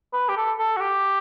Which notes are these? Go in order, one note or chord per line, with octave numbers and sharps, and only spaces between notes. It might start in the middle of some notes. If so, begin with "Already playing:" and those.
B4
G4
A4
A4
F#4
G4